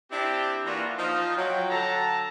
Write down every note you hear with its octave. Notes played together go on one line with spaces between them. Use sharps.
C4 D4 E4 G4
E3 A#3 D4 F4 F#4 A#5
F3 D#4 F4
F#3 G5
D3 F#3 A4 A5 A#5